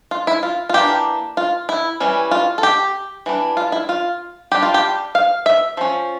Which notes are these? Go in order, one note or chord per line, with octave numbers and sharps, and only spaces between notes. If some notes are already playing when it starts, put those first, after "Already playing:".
F4
E4
F4
F4
E3 A#3 D4 G4
F4
E4
E3 G3 C#4
F4
A4
G4
E3 G3 D4
F4
E4
F4
G3 D4 G4
F4
G4
F5
E5
F3 C#4